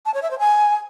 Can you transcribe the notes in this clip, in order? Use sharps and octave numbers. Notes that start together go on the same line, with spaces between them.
A5
C#5
E5
C5
G#5